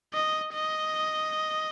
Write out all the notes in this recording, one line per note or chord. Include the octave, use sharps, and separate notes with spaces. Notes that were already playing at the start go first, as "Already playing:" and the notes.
D#5
D#5